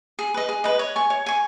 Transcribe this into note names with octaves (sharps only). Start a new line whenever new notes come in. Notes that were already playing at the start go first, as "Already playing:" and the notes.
G#4
B4 D#5
G#4
B4 D#5
C#5
G#5 C#6
C#5
G#5 C#6